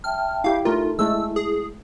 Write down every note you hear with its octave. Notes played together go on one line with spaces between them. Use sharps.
E5 G5 A5 F6
E4 G4 F5
A3 D#4 F4 A4 A#4
G#3 A3 E4 A4 E6
G#4